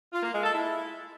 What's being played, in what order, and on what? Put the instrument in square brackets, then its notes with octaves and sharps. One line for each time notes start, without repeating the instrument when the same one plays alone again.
[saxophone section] F4
A#3
G#3
A4
E4